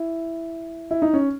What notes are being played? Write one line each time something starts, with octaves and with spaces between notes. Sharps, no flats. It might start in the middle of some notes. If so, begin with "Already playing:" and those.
Already playing: E4
E4
D#4
C#4